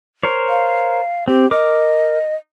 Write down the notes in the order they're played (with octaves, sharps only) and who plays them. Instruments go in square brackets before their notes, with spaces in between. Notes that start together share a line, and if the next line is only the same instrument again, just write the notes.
[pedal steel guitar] A#4 C5 C#5
[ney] F5
[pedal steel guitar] C4 [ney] G4
[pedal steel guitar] A#4 D6 [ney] D#5